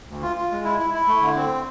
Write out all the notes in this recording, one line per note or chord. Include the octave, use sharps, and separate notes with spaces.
D2
F4
F4
G#3
E4
E4
E4
A3
D3
C4